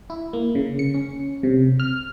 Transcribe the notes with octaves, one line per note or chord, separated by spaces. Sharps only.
E4
A#3
C#3
C#7
C#4
C3
F6